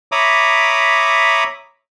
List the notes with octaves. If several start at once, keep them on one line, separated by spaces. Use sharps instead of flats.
C#5 E5 A#5 B5 D6 D#6